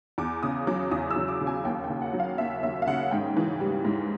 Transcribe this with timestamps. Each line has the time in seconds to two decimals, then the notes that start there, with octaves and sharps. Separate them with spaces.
0.18 E2 D6
0.43 C#3 D#6
0.67 F#3 D6
0.91 E2 D#6
1.11 E6
1.16 E2
1.28 D6
1.41 C#3
1.47 G#5
1.65 D#2 G5
1.84 G5
1.90 C#3
2.02 F#5
2.13 F#3
2.20 F5
2.38 D#2 E5
2.63 D#2 E5
2.82 F5
2.87 C#3 F#5
3.11 G#2 G5
3.37 E3
3.61 G3
3.85 G#2